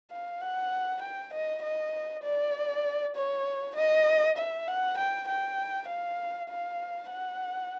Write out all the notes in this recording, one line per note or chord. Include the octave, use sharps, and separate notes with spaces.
F5
F#5
G5
D#5
D#5
D5
C#5
D#5
E5
F#5
G5
G5
F5
F5
F#5